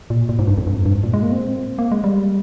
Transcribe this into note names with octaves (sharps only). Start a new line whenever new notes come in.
A#2
A#2
G#2
G2
F2
G2
G2
G#2
A#2
G#3
A#3
C4
A#3
G#3
G3